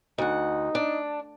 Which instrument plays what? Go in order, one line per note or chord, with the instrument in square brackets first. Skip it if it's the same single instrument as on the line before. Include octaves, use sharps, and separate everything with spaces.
[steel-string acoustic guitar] D2 F#5 [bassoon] D#4
[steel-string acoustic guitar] D4